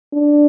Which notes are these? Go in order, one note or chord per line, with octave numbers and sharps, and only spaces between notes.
D4